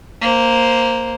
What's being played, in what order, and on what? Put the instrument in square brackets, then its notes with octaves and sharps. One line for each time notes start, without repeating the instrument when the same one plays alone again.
[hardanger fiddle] A#3 C5